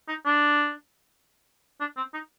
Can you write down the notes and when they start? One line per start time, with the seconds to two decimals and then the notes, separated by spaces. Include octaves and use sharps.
0.09 D#4
0.26 D4
1.80 D4
1.97 C4
2.14 D#4